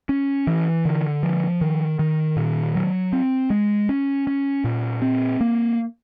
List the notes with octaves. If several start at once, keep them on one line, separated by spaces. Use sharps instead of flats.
C#4
E3
D3
F3
D#3
D#3
A#2
F#3
C4
G#3
C#4
C#4
A#2
C4
A#3